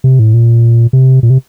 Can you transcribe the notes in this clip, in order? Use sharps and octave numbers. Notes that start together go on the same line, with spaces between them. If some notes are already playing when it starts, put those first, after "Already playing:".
C3
A2
A#2
C3
A#2
C3